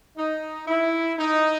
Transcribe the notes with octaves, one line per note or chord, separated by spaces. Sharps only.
D#4
E4
D#4